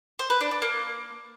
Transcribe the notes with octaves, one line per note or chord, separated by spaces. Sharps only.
C5
B4
D4
D4
A#3